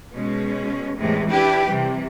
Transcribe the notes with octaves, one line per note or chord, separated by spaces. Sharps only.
B2 G#3 C#4
E2 A2 C3 E3 G#3
D4 E4 G4 B4
C3 E3 G3